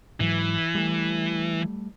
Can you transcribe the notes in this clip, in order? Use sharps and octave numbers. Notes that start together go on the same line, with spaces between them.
G#2 E3 F#3
G3 A3